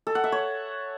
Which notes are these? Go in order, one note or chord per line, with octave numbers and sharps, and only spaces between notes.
A4
F#5
E5
C#5